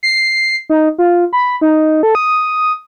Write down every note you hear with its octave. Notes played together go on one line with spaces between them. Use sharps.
C7
D#4
F4
B5
D#4
A4
D#6